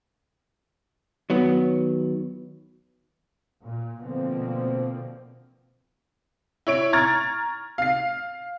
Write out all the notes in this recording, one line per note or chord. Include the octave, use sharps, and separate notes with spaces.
D#3 F#3 B3
A#2
B2 D3 F3 A#3 C4
E4 C#5 D7
A#5 C#6 F6 G#6 A6
F5 C7